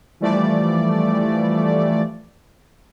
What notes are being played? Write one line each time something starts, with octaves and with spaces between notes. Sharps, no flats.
E3 F3 G3 A3 D5